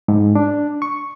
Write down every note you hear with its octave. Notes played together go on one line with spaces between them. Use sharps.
G#2
D4
C#6